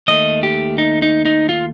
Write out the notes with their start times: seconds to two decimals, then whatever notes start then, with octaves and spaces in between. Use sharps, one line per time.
0.08 D#2 D#3 A3 D#5
0.43 G4
0.78 D#4
1.02 D#4
1.25 D#4
1.49 F4